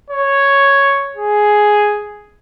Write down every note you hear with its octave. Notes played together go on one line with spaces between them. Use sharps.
C#5
G#4